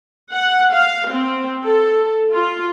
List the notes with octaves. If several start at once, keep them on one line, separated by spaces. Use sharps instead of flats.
F#5
F5
C4
A4
F4